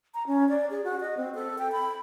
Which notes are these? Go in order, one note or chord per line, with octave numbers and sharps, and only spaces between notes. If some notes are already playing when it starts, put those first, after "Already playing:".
A#5
C#4
D5
G#4
F#4
D#5
C4
A4
G5
B5